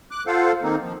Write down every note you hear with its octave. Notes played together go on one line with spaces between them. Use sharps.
D6 F#6
F4 A4 C5 F5 F#5
D#3 A#3 C4 D#4
F3